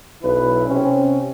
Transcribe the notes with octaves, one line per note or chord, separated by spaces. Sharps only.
B1 D4 E4 B4
C3 C4 C#4